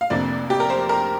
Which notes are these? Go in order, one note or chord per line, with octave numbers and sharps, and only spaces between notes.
F5
F1 F2 C3 A#3 D4 D5
G4
A#4
C5
A#4